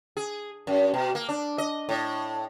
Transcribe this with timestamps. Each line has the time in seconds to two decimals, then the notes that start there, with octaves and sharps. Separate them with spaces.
0.17 G#4
0.67 F#2
0.94 B2
1.15 A#3
1.29 D4
1.58 D#5
1.89 A2